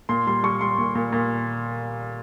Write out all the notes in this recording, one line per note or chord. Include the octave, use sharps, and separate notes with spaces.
A#2 C6
G3 C6
G3 C#6
G3 C6
A#2
A#2
A#2